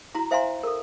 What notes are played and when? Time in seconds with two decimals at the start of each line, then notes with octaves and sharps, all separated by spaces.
0.15 E4 F#4 A#5
0.31 C5 E5 F5 G#5 A#5 C6
0.63 A4 A#4